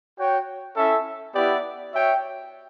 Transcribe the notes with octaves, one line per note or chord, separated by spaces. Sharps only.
F#4 C#5 G5
C#4 E4 A4 E5
B3 E4 G4 D5 F#5
F#4 C#5 E5 G5